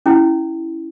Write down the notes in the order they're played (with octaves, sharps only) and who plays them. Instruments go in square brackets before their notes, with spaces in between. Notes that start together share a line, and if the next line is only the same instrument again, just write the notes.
[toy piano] C#4 E4